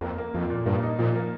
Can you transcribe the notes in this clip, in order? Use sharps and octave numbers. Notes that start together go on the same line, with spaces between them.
F2 A#3
A#3
F2 F4
A#2
G2 A#3
D#4
A#2 F3
A#3